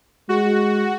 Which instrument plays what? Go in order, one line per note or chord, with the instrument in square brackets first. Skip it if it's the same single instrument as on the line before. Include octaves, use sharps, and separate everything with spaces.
[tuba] G#3 [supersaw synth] F#4